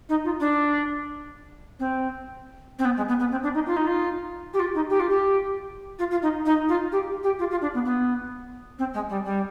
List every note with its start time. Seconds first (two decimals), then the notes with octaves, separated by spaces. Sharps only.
0.09 D#4
0.24 F4
0.40 D4
1.79 C4
2.79 C4
2.85 B3
2.96 G#3
3.08 B3
3.19 B3
3.31 C4
3.43 D4
3.54 D#4
3.66 F4
3.76 D#4
3.86 F4
4.53 G4
4.59 F4
4.75 D#4
4.90 G4
4.99 F4
5.09 G4
5.99 F4
6.10 F4
6.22 D#4
6.45 D#4
6.68 F4
6.92 G4
7.23 G4
7.39 F4
7.50 F4
7.61 D4
7.74 B3
7.85 B3
8.79 C4
8.94 G#3
9.09 G3
9.25 G3